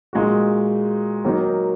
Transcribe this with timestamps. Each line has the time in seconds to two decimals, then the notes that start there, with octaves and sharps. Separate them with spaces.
0.13 A#2 G#3 D#4 F#4
1.25 D#3 F#3 A#3 D#4